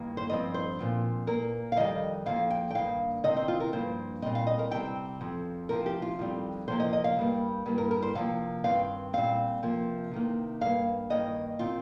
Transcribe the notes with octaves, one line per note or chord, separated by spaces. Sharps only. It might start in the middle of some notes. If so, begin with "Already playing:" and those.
Already playing: G2 D#3 A#3
C5
G2 F3 C4 D#5
C5
A#2 F3 C4
A#2 A#3 A#4
F5
F2 D#3 G3 D#5
F2 F3 A#3 F5
G5
G5
G2 D#3 A#3 F5
C3 D#3 C4 D#5
C5
F4
A#4
G2 F3 A#3 C5
A#2 G3 C4 D#5
F5
D#5
A#4
C3 G3 C4 G5
F2 F3 C4
C3 F3 C4 A#4
G4
F4
F2 D#3 G3 C4
C3 F3 A#3 C5
D#5
D#5
F5
G2 G3 A#3
G2 G3 A#3
A#4
A#4
C5
C3 F3 A#3 F5
G2 D#3 C4 F5
A#2 G3 C4 F5
C3 F3 A#3
C3 D#3 A#3
G2 G3 A#3 F5
G2 D#3 A#3 D#5
D#3 C4 F4